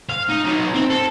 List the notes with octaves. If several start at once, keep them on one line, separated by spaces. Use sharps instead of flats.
F5
D#4
F#3 D#4
C4
A4